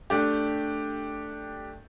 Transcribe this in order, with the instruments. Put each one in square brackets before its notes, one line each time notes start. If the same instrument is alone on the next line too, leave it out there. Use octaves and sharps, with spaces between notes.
[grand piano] A3 D4 G4